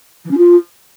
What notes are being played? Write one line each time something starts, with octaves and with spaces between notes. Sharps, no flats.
E3
C#4
F4